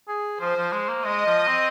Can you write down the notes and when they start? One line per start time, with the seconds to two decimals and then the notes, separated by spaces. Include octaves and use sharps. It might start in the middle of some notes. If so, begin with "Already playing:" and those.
0.08 G#4
0.40 F3 C5
0.57 F3
0.72 G#3
0.88 A#3
1.04 G#3 D#5
1.26 F3
1.47 C4